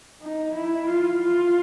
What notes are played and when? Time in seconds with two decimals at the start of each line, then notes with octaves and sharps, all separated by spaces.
0.22 D#4
0.55 E4
0.89 F4
1.23 F4